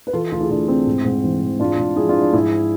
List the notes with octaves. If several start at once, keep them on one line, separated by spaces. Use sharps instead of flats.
B4
E3 F4 A4
D2 F4 A4
E4 G#4
D2 D4 F4
C3 C4 E4
G#2
G#2
E3
E3
G#2 D4 F4
G#2
F3 E4 G#4
D4 F4
F3
D4
G#2 E4 G#4